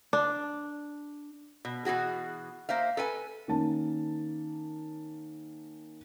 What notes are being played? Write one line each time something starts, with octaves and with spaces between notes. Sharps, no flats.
D4
B2
B2 E3 F#4 G#4
A#3 C5 E5 F5
A4 B4 G#5
D#3 A#3 C#4 A5